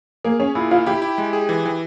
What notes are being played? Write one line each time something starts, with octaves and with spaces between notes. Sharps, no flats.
A#3 G#4
C#4 G#4
A#2 E4
E4 F4
E4 G4
E4
G#3
G#4
E3
E3